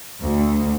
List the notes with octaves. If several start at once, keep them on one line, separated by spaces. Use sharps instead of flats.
D2